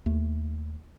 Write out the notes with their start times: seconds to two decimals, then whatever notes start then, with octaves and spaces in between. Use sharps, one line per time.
0.06 D#2 A3